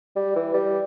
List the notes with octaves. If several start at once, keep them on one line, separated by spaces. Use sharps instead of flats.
G3
E3
G3